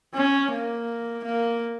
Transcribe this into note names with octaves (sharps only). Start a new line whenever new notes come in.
C#4
A#3
A#3